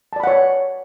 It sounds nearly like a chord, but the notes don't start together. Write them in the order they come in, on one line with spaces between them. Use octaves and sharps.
A5 D5 B5 F#5 C#5